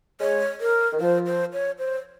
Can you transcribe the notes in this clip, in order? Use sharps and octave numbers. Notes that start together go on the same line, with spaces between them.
G#3 C#5
A#4
D#3
F3 C5
C5
C#5
C5